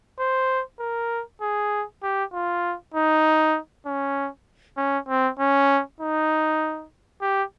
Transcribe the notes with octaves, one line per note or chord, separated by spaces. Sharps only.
C5
A#4
G#4
G4
F4
D#4
C#4
C#4
C4
C#4
D#4
G4